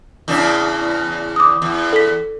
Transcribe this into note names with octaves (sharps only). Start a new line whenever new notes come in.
E2 C#3 D4
D6 D#6
E2
A4 B6